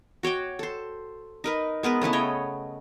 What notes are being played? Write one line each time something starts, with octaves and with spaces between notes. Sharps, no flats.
F#4 C#5 G5 D6
A4 C5
D#4 A#4 B4
G#3 B3 A#4 B4
C#3 A3 B3 E4
C#5 D#5 G5